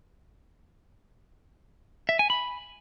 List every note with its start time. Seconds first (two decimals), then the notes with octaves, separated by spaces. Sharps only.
2.09 E5
2.19 G#5
2.30 B5